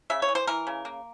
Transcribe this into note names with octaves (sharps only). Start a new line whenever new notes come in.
C#3 E5
C#5
E3
C5
E3 A#4
C#3
A#3